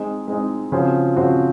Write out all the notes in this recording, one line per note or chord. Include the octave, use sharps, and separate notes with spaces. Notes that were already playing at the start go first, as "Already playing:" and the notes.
Already playing: G#3 C4 D#4
G#3 C4 D#4
C#3 F3 C4 F#4 C5
C#3 F3 C4 F#4 C5